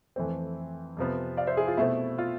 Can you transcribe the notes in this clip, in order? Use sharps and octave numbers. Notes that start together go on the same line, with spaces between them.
F2 E3 A3 C4
F2 C3 F3 B3
D5 F5
C5 E5
E4 G#4
F4
B2 A3 C4 E4
F4